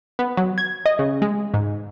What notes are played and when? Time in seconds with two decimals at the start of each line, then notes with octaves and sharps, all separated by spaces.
0.19 B3
0.37 F#3
0.58 G#6
0.86 D#5
0.99 C#3
1.22 G#3
1.54 G#2